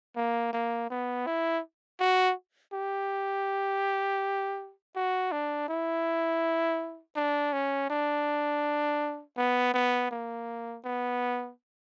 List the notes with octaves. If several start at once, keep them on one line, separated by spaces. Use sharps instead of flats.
A#3
A#3
B3
E4
F#4
G4
F#4
D4
E4
D4
C#4
D4
B3
B3
A#3
B3